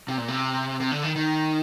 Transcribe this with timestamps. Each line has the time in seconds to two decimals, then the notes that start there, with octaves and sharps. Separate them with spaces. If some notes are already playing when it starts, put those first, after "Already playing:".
0.08 C3
0.18 A#2
0.28 C3
0.80 C3
0.91 D3
1.03 D#3
1.16 D#3